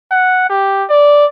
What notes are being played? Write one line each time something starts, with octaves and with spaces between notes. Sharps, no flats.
F#5
G4
D5